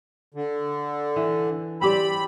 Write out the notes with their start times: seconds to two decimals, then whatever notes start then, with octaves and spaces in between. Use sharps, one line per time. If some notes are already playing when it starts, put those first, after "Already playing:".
0.34 D3
1.16 E3
1.81 C4 G4 D5 B5